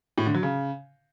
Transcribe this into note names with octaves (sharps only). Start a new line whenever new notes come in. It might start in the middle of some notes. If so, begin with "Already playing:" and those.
A2
D3
F#3
C#3